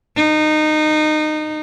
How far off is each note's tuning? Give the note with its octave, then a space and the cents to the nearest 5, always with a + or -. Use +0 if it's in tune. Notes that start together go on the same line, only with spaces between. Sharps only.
D#4 -20